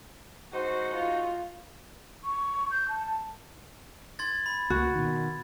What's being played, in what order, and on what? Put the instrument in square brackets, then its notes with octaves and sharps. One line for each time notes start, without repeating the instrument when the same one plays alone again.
[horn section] G#2 D#4 F#4 [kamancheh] C5
[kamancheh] F4
[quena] C#6
G6
A5
[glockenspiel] C6 G#6 A6
B5
[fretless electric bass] C#2 A#3 [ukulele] F#4
[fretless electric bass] B2 D#3